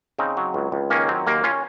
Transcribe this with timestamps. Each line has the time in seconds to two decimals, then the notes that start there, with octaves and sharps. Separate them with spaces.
0.19 C#3 C4 D#4
0.37 F#3
0.54 C#2
0.72 C#2
0.90 D#3 A#3 C#4
1.09 F#3 C4
1.27 D#2 A#3
1.44 C#4 F4